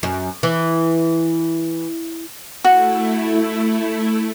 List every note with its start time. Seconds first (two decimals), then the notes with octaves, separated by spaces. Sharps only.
0.03 F#2
0.43 E3
2.64 A3 E4 F#4